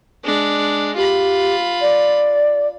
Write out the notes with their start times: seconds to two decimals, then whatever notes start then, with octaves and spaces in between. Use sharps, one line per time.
0.25 G#3 D4
0.96 F4 G4 B5
1.81 D5